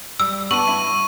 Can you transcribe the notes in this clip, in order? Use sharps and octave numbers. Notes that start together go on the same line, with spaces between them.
G3 E6
B3 D4 C#6 D#7 F#7
E4